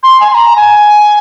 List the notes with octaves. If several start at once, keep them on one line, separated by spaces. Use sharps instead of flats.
C6
G#5
C6
A#5
G#5